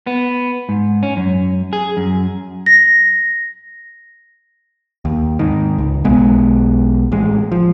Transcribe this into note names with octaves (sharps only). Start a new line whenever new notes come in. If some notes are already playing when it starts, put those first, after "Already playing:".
B3
G#2
C#4
F#2
G#4
F#2
A#6
D#2
G#2 D#3
C#2
B1 G#3 B3
A1 G#3
F3